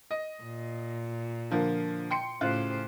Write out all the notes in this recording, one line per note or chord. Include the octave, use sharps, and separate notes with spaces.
D#5
A#2
D3 F3 A#3
G5 C6 C#7
A2 C#3 F4 G4 C5 F#6